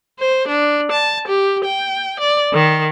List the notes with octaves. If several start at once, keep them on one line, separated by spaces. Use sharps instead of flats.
C5
D4
A5
G4
G5
D5
D#3